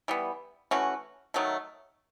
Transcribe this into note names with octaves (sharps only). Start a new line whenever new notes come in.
E3 G3 B3
E3 A3 C#4 F#4
D#3 F#3 A3